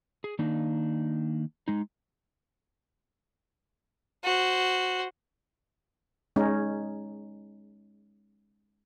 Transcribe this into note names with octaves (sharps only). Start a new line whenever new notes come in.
G#4
D#3 A#3 D4 D#4
G#3 D#4
F#4 C5
G#3 C#4 D#4